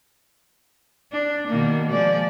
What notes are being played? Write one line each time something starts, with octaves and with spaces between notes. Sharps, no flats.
D4
B2 D#3 A#3
F3 G#3 D5